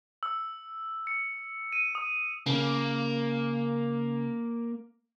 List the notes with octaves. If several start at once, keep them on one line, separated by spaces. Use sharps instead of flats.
E6
C#7
D#7
D#6
C#3 A#3